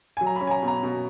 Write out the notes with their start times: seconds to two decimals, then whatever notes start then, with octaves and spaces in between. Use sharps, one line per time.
0.17 F#3 G#5
0.27 A#5
0.36 C#4 B5
0.47 G#5
0.51 A#5
0.62 B2
0.68 A#5
0.83 B2